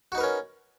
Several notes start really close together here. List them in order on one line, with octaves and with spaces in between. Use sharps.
F#4 D#4 B4 A#4 C#4